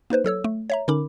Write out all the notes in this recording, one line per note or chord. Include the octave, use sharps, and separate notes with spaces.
A#3 D#4 B4 C5
F#3 A4 C#5 E6
A3
C#5 E5 A#5
D3 C#4 D#4 A#4 B5 D6